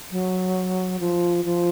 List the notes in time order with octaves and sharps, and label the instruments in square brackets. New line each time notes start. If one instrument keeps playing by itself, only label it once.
[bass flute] F#3
F3
F3